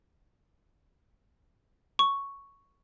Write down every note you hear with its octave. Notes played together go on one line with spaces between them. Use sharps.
C#6